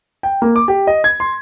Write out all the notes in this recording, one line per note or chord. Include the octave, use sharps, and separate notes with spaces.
G5
A#3
D6
G4
D#5
G#6
C6